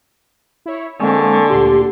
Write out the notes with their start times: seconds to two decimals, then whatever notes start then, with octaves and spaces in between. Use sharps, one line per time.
0.66 E4 C#5
1.00 D3 G#3 A#3 C4 G#5 C#6
1.50 D2 A#2 G4 C6